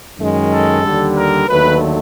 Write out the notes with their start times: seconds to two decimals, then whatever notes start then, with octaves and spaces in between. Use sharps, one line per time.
0.19 F#2 D#3 G#3
0.51 A4
0.83 D#2 D3 G3
1.15 A#4
1.47 D#2 D3 F#3 A3 B4